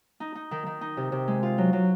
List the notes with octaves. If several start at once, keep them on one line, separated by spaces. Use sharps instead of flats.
D#4
D#4
D#3
D#3
D#4
C3
C3
G#3
F4
F#3
F#3